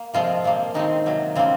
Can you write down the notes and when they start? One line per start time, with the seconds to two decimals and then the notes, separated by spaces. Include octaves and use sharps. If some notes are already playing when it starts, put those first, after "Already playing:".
Already playing: A#3
0.14 C3 F3 G#3 C4 F4
0.44 A#2 F3 A#3
0.74 D#3 G#3 C4 D#4
1.06 C3 F#3 A#3
1.35 C#3 F3 A#3 C4